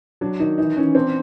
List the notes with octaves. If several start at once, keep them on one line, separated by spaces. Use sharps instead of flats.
F#3 D4
D#3 D#4
E3 D#4
E3 C#4
C4 D4